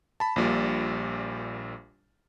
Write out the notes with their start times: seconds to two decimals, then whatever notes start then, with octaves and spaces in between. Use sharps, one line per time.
0.20 A5 B5
0.36 A#1 A#2 G3